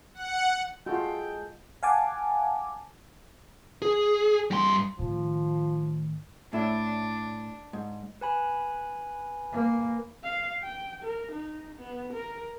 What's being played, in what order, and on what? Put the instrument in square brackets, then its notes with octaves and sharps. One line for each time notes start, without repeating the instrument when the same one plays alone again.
[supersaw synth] F#5
[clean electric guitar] G#3 A4 [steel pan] F4 F#4 [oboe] G5
[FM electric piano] F5 F#5 G#5 A5 D6
[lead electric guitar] G#4
G2 C6
[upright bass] A2 D#3 [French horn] F3
[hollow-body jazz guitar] A2 E4 [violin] D4
[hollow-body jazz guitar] G#2
[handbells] B4 G#5 B5
[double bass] A#3
[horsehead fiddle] F5
G5
A#4
D#4
B3
A#4